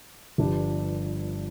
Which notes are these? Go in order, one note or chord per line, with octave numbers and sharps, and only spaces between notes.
G1 G2 F3 D4 G4